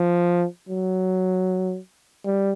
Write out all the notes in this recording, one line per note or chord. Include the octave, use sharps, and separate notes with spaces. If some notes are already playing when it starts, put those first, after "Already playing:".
Already playing: F3
F#3
G3